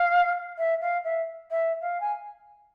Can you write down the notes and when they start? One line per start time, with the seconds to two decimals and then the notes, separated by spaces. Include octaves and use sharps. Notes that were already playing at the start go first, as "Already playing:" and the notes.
Already playing: F5
0.58 E5
0.81 F5
1.04 E5
1.50 E5
1.81 F5
2.00 G#5